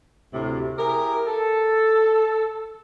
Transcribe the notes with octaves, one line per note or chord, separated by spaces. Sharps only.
D2 A2 C3
E4 G4 G#4 A#4
A4